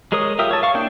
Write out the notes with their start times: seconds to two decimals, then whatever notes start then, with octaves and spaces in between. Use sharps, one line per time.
0.12 G#3 G#4 A#4 C#5 D#6
0.39 F4 G4 A#4 E5 D#6
0.51 C#5 A5
0.63 F5 C#6
0.74 A#3 D4 E4 G5